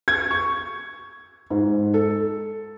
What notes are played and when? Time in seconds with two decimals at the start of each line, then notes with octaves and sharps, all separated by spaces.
0.08 G#6
0.31 C#6
1.50 G#2
1.94 A4